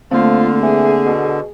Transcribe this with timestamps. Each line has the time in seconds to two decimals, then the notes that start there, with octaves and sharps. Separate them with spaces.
0.11 D3 F3 A3 A#3 C4 F4
0.63 E3 G#4
1.06 B2